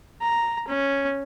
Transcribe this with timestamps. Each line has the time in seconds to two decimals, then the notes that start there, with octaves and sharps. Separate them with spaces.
0.22 A#5
0.68 C#4